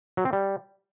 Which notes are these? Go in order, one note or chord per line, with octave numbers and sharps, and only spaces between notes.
F#3
C4
G3